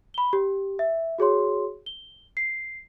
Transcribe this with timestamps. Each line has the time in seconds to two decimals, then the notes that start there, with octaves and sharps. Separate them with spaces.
0.14 B5 G7
0.33 G4
0.79 E5
1.18 F#4 G#4 C#5 C6
1.86 G7
2.37 C7